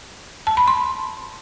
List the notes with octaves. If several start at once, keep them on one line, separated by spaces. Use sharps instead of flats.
A5
B5
C6